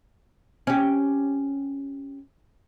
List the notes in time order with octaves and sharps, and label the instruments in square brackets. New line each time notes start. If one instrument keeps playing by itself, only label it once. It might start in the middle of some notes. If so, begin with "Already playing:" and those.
[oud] C#4 G4